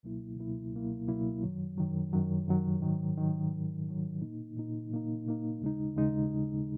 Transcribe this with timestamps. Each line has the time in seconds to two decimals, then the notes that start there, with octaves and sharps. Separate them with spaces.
0.03 C#2 B2 F#3 A#3 E4
0.39 C#2 B2 F#3 A#3 E4
0.73 C#2 B2 F#3 A#3 E4
1.08 C#2 B2 F#3 A#3 E4
1.43 F#2 D#3 F#3
1.78 F#2 D#3 F#3
2.13 F#2 D#3 F#3
2.48 F#2 D#3 F#3
2.82 G#2 D#3 F#3
3.17 G#2 D#3 F#3
3.52 G#2 D#3 F#3
3.87 G#2 D#3 F#3
4.22 A#2 A#3 D#4
4.56 A#2 A#3 D#4
4.91 A#2 A#3 D#4
5.26 A#2 A#3 D#4
5.61 D#2 C#3 G#3 D#4
5.96 D#2 C#3 G#3 D#4